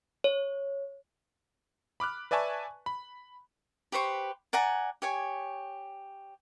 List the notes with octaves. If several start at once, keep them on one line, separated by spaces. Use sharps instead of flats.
C#5
B5 D6 F6 F#6
B4 D5 E5 G#5 A5 C#6
B5
G4 B4 C5 C#6
D5 F#5 G#5 A#5
G4 C#5 G#5